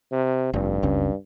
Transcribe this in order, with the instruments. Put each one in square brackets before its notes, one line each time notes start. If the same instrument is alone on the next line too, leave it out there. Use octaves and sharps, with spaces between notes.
[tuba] C3
[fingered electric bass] F1 [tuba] G2
[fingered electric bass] F#1 C#2 C#4